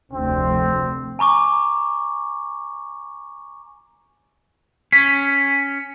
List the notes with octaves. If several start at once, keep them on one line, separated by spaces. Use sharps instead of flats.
F1 D2 C4
G#5 A#5 C#6 D6
C#4 B6